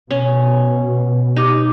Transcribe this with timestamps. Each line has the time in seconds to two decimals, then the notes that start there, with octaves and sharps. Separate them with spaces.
0.11 B2 C#4
1.36 D#4 G4 D6